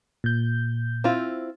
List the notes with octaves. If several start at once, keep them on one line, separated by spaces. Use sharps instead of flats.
A#2 G6
C4 E4 F4